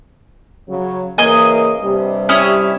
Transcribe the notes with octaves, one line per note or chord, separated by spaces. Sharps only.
C#3 F#3
C#3 E3 A#3 D#5 G#5
G2 C3 G3
C#4 E4 D#6